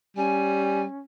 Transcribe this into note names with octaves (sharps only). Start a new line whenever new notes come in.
G3 C#4 G#5